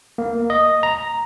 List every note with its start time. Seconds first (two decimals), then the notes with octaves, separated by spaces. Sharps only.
0.18 A#3
0.50 D#5
0.83 A#5